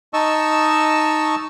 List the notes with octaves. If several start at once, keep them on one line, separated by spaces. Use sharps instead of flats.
D#4 D#5 A5 C#6 E6